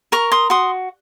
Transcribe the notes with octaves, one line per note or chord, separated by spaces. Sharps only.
A#4 A#5 C#6
C6 D#6
F#4 C6 D#6